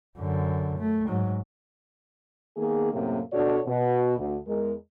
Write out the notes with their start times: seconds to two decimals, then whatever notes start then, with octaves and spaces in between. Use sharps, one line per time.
0.18 F#2 D3
0.79 A3
1.07 G#2 F#3
2.57 D#3 A#3 B3 G#4
2.93 F#2 A2 C3 A#3
3.32 B2 D4 F#4 A4 C#5 D5
3.66 B2
4.18 D2
4.47 E2 G#3 A#4